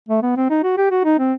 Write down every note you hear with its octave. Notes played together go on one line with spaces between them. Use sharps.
A3
B3
C4
D#4
F#4
G4
F#4
D#4
C4